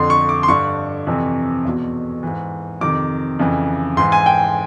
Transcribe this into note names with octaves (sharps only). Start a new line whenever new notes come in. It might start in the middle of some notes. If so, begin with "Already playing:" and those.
Already playing: F2 D3 C6
C#6
D6
C6
G2 D3 C#6
F2 C3 E3
E2 B2
G#2 E3
F2 C3 D#3 D6
F2 C#3 E3
G#2 E3 C6
G#5
G5